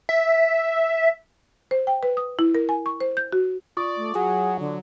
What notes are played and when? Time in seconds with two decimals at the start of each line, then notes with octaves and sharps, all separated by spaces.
0.09 E5
1.71 C5
1.87 G5
2.03 B4
2.17 D#6
2.39 E4
2.55 A#4
2.69 G#5
2.86 C#6
3.00 C5
3.17 G6
3.32 F#4
3.77 F4 D5 C#6 D#6
3.97 A3
4.15 F#3 G#4 F#5
4.60 D3